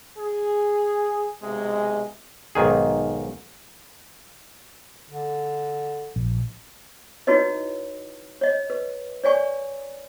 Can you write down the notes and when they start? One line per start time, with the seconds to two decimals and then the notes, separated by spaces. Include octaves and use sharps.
0.18 G#4
1.42 B1 C3 G#3
2.55 B1 G#2 D#3 G#4
5.10 D3
6.16 A#1
7.27 D#4 E4 F#4 B4 C#5 D#5
8.41 C#5 D#5
8.70 B4
9.24 C#5 D5 G#5 C#6